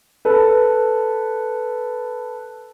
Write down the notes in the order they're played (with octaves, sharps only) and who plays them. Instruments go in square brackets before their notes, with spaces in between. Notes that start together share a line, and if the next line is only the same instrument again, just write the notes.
[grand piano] A4 B4